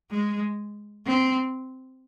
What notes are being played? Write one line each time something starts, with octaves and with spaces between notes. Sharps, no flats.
G#3
C4